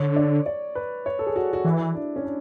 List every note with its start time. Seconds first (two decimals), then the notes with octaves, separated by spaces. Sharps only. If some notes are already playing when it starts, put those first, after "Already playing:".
Already playing: D3 C#5
0.16 D5
0.46 D5
0.75 B4
1.06 C#5
1.19 A4
1.27 G#4
1.36 F#4
1.53 F#4
1.64 E3 E4
1.95 D4
2.16 C#4
2.25 D4